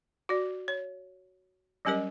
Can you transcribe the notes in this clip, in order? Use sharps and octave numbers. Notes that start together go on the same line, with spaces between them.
F#4 D5
C#5
F#3 G3 C#4 G4 A#4 D#5